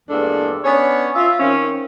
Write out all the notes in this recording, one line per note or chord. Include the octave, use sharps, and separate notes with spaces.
E2 G2 G#3 A#3 D4 A4
B3 C#4 D4 C#5
F4 E5 F5
D#3 C4 C#4